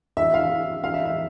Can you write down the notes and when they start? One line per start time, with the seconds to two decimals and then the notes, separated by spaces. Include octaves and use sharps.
0.17 E5
0.34 F5
0.84 F5
0.94 E5
1.05 E5